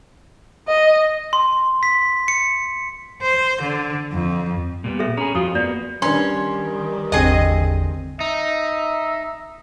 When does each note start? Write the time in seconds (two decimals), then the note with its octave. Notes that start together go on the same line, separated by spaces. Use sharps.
0.68 D#5
1.33 C6
1.83 B6
2.28 C#7
3.22 C5
3.62 D3
4.13 F2
4.84 A#2 G3 B3
4.99 G#4 A4 E5
5.17 C#4 G#4 A#5 B5
5.35 F2 F4 F#4 D#6
5.55 A#3 B3 D5
6.02 D#3 G3 C#4 D4 B4 C6
7.12 G#1 E2 D3 C4 G#4 D#5
8.21 D#4 E5